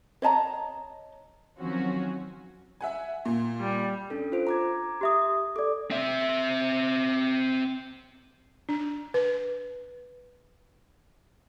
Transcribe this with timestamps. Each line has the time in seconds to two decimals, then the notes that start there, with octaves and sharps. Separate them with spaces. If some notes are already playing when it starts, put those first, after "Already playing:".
0.22 C#5 D#5 A5 A#5
1.59 D#3 F3 F#3 C4 C#4 F#4
2.81 E5 F#5 G#5
3.25 A#2
3.60 G3
4.10 C#4 D4 A4
4.32 F4 C5 D7
4.47 A#5 D6 G#6
5.01 G4 E5 D#6
5.56 A4 D5 D6
5.91 C4 E5
8.69 D4
9.14 B4